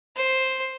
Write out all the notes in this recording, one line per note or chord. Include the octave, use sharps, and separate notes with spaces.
C5